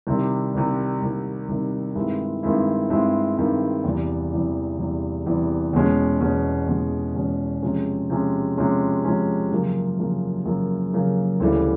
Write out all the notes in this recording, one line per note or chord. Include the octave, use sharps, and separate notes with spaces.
C2 C3 D#3 G3
C2 C3 D#3 G3
C2 C3 D#3 G3
C2 C3 D#3 G3
G2 D#3 G#3 C4 E4
G2 D#3 G#3 C4 E4
G2 D#3 G#3 C4 E4
G2 D#3 G#3 C4 E4
E2 C3 E3 G3
E2 C3 E3 G3
E2 C3 E3 G3
E2 C3 E3 G3
E2 B2 G#3 C#4
E2 B2 G#3 C#4
E2 B2 G#3 C#4
E2 B2 G#3 C#4
C3 F3 G#3 C#4
C3 F3 G#3 C#4
C3 F3 G#3 C#4
C3 F3 G#3 C#4
F#2 C#3 F3 A#3
F#2 C#3 F3 A#3
F#2 C#3 F3 A#3
F#2 C#3 F3 A#3
D2 C#3 E3 G3